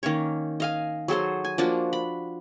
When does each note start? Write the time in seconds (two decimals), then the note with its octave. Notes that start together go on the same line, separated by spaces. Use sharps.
0.03 D#3 A#3 C#4 C#5
0.60 D#5 F5 G#5
1.08 F#3 G#4 A4 C5
1.45 G#5
1.58 F3 A#3 D4 F#4
1.93 B5